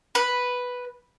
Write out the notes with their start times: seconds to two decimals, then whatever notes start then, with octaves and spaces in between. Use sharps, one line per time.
0.15 B4